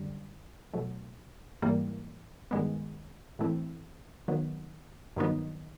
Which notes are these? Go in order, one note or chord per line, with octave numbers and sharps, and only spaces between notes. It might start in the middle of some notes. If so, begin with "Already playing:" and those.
Already playing: F#2 D3 G3
B2 F#3 A3
G#2 E3 G3 A#3
G2 D#3 G#3 B3
A2 E3 A3 C4 E4
D#3 F#3 B3
G2 D#3 F#3 B3 D#4